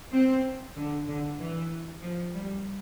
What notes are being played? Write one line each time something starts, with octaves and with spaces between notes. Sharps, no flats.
C4
D3
D3
E3
F3
G3